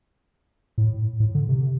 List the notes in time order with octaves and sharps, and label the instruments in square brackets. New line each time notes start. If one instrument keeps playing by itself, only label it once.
[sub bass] A2
A2
D3
C3